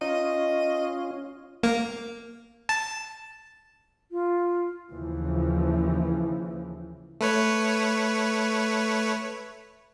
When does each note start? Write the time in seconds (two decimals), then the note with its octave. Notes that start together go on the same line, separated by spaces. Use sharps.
0.01 C#4 F4 D#5
1.63 A#3
2.69 A5
4.12 F4
4.90 D#2 C#3 E3 F3
7.21 A3 B4 C#5